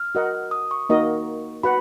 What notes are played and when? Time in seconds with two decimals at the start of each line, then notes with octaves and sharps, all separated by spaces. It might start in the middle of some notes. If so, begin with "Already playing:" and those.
Already playing: F6
0.15 F#4 A#4 D#5 F#5
0.51 D#6
0.71 C#6
0.90 A#3 D#4 F#4 A#4 D#5
1.63 F#4 B4 F#5 B5